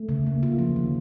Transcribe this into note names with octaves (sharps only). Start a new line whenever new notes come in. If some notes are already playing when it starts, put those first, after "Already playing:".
Already playing: A3
C#3
A#3
F4
F3
D#3